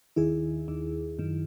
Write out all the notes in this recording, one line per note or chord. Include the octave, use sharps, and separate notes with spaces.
D#2 D#3 E4 G#4
D#2 D#3
F#2 D#3